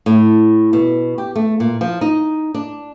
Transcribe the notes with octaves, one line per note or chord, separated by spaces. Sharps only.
A2
B2
G4
A3
A#2
F3
D#4
D4